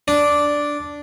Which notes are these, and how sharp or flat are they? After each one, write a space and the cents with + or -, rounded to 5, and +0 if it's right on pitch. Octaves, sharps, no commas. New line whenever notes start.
D4 -5